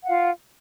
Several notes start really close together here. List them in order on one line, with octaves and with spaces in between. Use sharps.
F#5 F5 F4